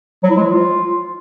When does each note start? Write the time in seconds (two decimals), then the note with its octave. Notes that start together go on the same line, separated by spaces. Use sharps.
0.23 F#3
0.30 E4
0.37 G#3
0.43 F3
0.50 F4